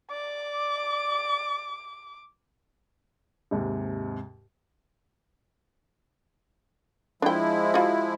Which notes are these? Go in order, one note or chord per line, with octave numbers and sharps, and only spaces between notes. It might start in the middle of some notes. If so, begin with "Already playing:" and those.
D5 D6
D#2 G#2 C3
F3 G#3 D4 E4 G5
F4 F#4